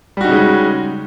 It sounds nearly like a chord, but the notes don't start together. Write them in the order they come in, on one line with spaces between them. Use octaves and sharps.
G3 F#4 D#4 C#3 G#3